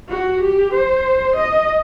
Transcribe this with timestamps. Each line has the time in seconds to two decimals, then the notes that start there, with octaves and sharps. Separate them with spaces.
0.09 F#4
0.41 G4
0.74 C5
1.37 D#5